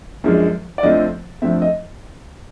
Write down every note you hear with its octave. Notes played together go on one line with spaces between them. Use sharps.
F#2 D3 F3 G#3
D5
F2 D3 F3 A3 C4 D#5
F2 D3 F3 A3 C4 E5
D#5